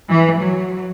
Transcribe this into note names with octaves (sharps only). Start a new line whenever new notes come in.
E3
F#3